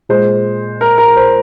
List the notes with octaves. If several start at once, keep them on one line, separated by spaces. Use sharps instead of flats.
A#2 G#3 C5
A#4
A#4
C5